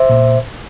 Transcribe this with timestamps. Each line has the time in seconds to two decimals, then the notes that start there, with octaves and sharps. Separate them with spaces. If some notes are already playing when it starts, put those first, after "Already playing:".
Already playing: C5 E5
0.10 A#2